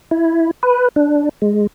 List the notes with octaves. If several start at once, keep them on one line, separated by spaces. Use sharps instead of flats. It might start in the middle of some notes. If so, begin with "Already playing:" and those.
E4
B4
D4
G#3